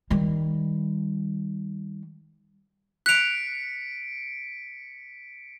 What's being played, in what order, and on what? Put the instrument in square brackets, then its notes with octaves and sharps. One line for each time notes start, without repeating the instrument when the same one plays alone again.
[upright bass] D#3 G3
[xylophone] F#6 F7 [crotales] B6 C#7 D7